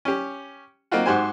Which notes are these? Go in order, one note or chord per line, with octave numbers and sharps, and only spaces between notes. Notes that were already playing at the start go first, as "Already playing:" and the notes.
C#4 G4
A#3 C4 D#4 F4 F#4
G#2 F#4 G4 C5 G#5